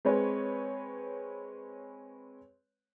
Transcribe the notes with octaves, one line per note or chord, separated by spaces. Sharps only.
G#3 C4 B4 C#5